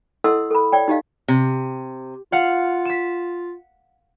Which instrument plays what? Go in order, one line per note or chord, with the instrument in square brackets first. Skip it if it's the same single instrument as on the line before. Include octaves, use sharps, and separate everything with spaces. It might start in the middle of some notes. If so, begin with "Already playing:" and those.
[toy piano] E4 A4 D#5 F#5 C6 E6
A4 B5
C#5 D5 G5
D#4 G4 D#5 F5
[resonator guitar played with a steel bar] C3
[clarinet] F4 [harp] F5 F#5
[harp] B6 E7